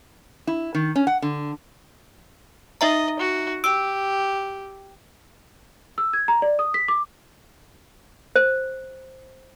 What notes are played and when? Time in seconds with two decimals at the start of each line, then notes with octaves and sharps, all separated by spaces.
0.47 E4
0.75 D#3
0.96 C#4
1.07 F#5
1.22 D3
2.81 D#4 D#5 E5 A#5
3.20 F#4
3.64 G4 E6 D7
5.98 E6
6.13 G#6
6.28 A#5
6.42 D5
6.59 D#6
6.74 B6
6.88 D6
8.36 C5